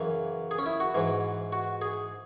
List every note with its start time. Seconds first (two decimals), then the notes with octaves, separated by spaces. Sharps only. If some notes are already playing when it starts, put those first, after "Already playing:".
Already playing: F#2 C#3 E3
0.51 G#4
0.58 C#4
0.66 E4
0.80 F#4
0.95 G#2 E3
1.52 F#4
1.81 G#4